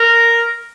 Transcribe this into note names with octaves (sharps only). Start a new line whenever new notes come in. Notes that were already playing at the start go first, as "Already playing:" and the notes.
Already playing: A#4